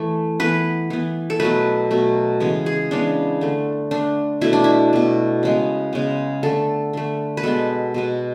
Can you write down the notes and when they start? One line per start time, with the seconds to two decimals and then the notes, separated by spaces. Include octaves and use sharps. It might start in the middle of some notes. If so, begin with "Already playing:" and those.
Already playing: E3 A3
0.40 E3 B3 B4
0.90 E3 B3
1.30 A4
1.40 B2 F#3 A3 B4
1.91 B2 F#3 A3
2.40 C#3 E3 G#3 B3
2.66 G#4
2.91 C#3 E3 G#3 B3 D4
3.41 D3 A3
3.91 D3 A3 D4
4.41 B2 A3 E4
4.53 D4
4.64 E4
4.93 B2 A3
5.43 C#3 G#3 B3
5.93 C#3 G#3 B3
6.43 D3 A3 A4
6.93 D3 A3
7.37 B4
7.43 B2 G#3 B3 A4
7.94 B2 G#3 B3